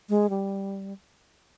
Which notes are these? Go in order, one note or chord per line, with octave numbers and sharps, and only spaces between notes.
G#3
G3